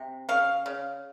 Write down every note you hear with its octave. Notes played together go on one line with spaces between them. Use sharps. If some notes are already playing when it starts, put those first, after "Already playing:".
Already playing: C3
C#3 F5
C#3